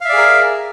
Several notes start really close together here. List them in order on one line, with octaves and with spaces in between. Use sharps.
F5 E5 D5 G#4 A#4